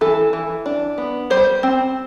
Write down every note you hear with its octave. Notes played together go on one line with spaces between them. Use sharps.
E3 A4
E3
D4
B3
G3 C5
C4